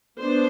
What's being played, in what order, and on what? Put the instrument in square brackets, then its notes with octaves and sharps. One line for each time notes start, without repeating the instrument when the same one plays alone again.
[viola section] B3 D4 C5